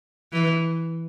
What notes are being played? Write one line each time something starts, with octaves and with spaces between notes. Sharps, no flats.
E3